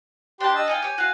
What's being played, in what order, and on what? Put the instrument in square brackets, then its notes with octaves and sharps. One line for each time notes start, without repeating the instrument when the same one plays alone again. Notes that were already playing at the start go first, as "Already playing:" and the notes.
[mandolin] D4 A5 [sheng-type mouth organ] G4 C6
[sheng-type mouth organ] D#5 E6
[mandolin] D#4 F4 G5 [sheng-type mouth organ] G#5
[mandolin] G4 C#5
F#4 F5